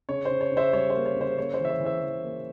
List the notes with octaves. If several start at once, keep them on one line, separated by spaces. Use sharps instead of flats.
C#3 C#5
C5
C#3
C#5
C#3
C5 E5
G3 C#5
C5
A#3
C#5
C#3
C5
A#3 C#5
C5
E3
E5
C#5
E3
C5 E5
E3
A#3